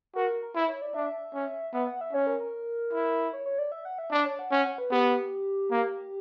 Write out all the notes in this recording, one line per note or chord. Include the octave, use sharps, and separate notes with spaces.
F#4 A#4
A#4
E4 B4
C#5
D5
D4 E5
C#4
B3 E5
F#5
E5
C#4 C#5
A#4
A#4
E4
C#5
C#5
D5
E5
F#5
E5
D4 D5
C#5
F#5
C#4 F#5
F#5
B4
B3 G4
A#3